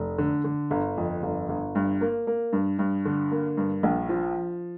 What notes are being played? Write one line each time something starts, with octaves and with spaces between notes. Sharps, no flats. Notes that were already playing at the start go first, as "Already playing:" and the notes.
Already playing: F1
D3
D3
G1
F2
G1
G1
G2
A#3
A#3
G2
G2
D3
A#3
G2
A#1
F3